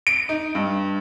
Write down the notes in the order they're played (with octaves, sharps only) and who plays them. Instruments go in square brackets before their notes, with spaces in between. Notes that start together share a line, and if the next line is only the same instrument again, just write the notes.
[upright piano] D7
D#4
G2